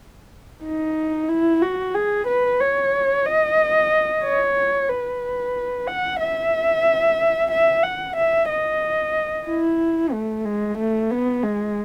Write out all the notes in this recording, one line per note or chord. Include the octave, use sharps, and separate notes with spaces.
D#4
E4
F#4
G#4
B4
C#5
D#5
C#5
B4
F#5
E5
E5
F#5
E5
D#5
E4
A3
G#3
A3
B3
G#3